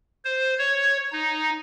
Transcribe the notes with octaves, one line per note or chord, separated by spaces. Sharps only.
C5
C#5
D#4